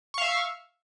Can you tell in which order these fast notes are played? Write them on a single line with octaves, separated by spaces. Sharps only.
C#6 F5 E5